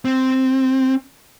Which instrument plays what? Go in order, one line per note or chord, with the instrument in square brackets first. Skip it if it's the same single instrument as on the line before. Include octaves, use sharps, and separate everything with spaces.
[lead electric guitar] C4